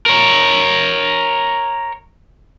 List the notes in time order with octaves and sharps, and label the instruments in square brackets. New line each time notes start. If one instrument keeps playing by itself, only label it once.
[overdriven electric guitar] A#4 C#5